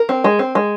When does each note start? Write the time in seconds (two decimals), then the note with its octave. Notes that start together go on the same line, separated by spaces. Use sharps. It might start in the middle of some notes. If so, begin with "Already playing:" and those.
Already playing: A#4
0.09 C4
0.24 G#3
0.39 C4
0.55 G#3